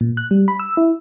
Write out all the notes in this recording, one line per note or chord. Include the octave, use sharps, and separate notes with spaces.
A#2
F#6
G3
B5
E6
E4